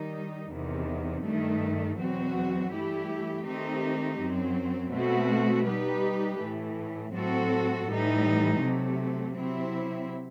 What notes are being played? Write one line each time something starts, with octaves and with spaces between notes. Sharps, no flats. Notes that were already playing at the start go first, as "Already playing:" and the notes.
Already playing: D#3 G3 D#4
E2 C3 D#3
G2 D#3 A3
E2 B2 F#3 C4 F#4
G2 E3 A3 E4 G4
D#3 A3 C4 D#4 G4
F#2 F#3 C4
B2 A3 C4 F#4
G3 D#4 G4 B4
A2 E3 A3
A2 F#3 C4 F#4 A4
A2 E3 G3 D#4
C3 F#3 A3
C3 F#3 C4 E4